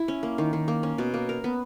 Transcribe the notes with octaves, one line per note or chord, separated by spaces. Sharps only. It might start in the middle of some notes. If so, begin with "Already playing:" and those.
Already playing: E4
C#4
A#3
D#3
D#3
A#3
C#4
B2
A#3
A#4
B3